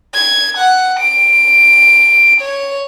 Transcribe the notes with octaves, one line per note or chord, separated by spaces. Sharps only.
G#6
F#5
D7
C#5